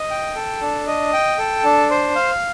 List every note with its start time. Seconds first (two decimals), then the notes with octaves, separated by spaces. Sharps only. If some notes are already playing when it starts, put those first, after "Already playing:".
Already playing: D#5
0.10 G5
0.35 A4
0.62 D4
0.87 D#5
1.13 G5
1.38 A4
1.64 D4
1.90 C5
2.16 F5